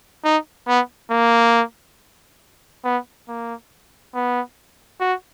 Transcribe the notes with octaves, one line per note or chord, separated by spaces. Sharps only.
D#4
B3
A#3
B3
A#3
B3
F#4